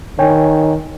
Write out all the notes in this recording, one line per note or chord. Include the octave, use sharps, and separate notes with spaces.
D#3 C#5 G5 G#5